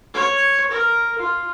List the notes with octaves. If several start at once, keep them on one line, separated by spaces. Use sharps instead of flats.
C#5
A#4
F4